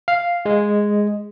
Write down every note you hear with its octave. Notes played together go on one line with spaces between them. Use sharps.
F5
G#3